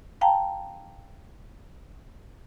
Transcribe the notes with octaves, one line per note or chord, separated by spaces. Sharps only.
F5 G5 A5 A#5